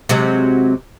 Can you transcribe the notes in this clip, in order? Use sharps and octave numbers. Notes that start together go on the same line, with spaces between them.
C3 F#3 G#3